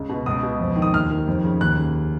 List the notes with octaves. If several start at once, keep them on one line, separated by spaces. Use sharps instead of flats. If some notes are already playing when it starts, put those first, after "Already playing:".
Already playing: C#2 C#3
B2
C#2 D#6
B2
F2
D#3
D#6
D#2 F6
D#3
F2
C#3
D#2 F#6
C#3